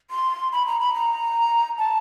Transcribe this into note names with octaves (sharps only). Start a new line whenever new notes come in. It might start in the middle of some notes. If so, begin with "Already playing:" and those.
C6
B5
A#5
B5
A#5
A5